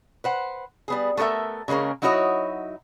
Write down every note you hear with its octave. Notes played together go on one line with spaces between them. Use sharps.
B4 C5 F#5
G3 B3 G#4
A3 B3 A4 A#4 E5
C#3 G#3 A#3 C#4 A#4
F#3 D#4 E4 F#4 C#5 D#5